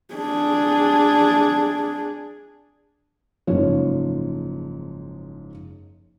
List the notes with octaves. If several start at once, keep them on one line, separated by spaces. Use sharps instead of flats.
D4 G#4
F#1 G#2 F3 C#5